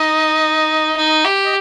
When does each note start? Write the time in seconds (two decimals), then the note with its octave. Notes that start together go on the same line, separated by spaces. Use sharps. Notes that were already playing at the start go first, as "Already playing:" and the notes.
Already playing: D#4 D#5
0.96 D#4
1.24 G4
1.45 D#5